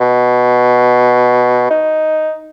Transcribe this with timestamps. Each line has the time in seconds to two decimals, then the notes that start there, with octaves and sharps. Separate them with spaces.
0.01 B2
1.71 D#4